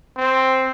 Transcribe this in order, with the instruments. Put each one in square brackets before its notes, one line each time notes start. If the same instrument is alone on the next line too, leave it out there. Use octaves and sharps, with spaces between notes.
[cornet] C4